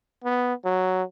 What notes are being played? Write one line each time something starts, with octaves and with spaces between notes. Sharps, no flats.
B3
F#3